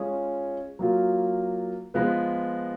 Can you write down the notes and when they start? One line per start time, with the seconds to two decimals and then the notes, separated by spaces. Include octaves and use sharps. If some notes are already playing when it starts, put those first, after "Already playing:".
Already playing: G#3 C#4 F4 G#4
0.79 F#3 A#3 F4
1.94 F3 G#3 B3 F4 B4